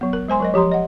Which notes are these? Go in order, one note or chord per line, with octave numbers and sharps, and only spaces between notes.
F#3 B3
A#4
G#3 C5 G#5 C6
F#3 A#4 D#5
F3 G4 A#5 C6
D#5 F#5